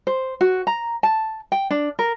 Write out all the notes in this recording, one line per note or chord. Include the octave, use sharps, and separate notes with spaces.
C5
F#4
A#5
A5
G5
D4
A#4